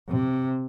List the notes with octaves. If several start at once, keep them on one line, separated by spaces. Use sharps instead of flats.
C3